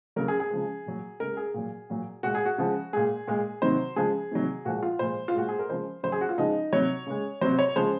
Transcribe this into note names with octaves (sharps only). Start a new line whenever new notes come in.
C#3 F#3 A#4
G#4
G#4
C#3 F3 G#3
A#2 F#3
C#3 G#3 A#4
G#4
A#2 F#3
A#2 F#3
A#2 G#3 F#4
G#4
F#4
C#3 F3 G#3
A#2 G#3 G#4
A#2 G#3
C3 D#3 F#3 C5
C#3 F3 G#3 G#4
C3 D#3 F#3
A#2 F3 G#3 F#4
F4
A#2 F3 G#3 C5
F4
A#2 G#3 F#4
G#4
A#4
C#3 F3 G#3 C5
C#3 F#3 C5
G#4
F#4
F4
C#3 F3 G#3 D#4
C3 F#3 C#5
C#3 G#3
C3 F#3 C5
C#5
C#3 F3 G#3 C5